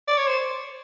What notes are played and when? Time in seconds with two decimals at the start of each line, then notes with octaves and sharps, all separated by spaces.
0.08 D5
0.17 C#5
0.27 C5